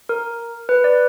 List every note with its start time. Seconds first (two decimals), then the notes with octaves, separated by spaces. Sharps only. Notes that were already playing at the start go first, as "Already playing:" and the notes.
0.09 A#4
0.69 B4
0.84 D5